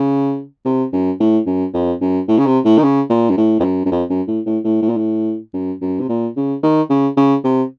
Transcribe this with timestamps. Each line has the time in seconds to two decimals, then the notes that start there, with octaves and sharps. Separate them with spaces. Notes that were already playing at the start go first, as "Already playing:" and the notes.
Already playing: C#3
0.65 C3
0.93 F#2
1.20 A2
1.46 F#2
1.74 F2
2.01 F#2
2.28 A2
2.38 C#3
2.46 C3
2.65 A2
2.78 D#3
2.83 C#3
3.10 A#2
3.30 F#2
3.37 A2
3.60 F2
3.64 F#2
3.85 F#2
3.91 F2
4.09 F#2
4.27 A2
4.46 A2
4.64 A2
4.82 A2
4.89 A#2
4.97 A2
5.54 F#2
5.81 F#2
6.00 C3
6.09 A#2
6.36 C#3
6.63 D#3
6.90 C#3
7.17 C#3
7.44 C3